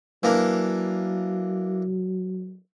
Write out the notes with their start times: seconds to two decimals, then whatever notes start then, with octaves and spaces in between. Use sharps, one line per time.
0.23 E3 F#3 A#3 D4